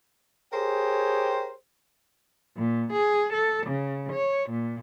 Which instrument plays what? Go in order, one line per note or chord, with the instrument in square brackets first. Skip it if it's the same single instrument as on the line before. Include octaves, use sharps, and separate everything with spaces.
[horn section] G4 G#4 A#4 C5 C#5 G5
[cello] A#2
G#4
A4
C#3
C#5
A#2